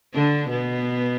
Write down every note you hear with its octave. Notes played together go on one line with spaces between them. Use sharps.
D3 D4
B2 B3